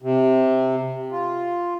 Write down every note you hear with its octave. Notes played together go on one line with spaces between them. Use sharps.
C3
F4